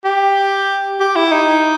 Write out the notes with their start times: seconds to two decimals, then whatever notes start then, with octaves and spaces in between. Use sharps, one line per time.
0.05 G4
1.00 G4
1.16 E4
1.32 D#4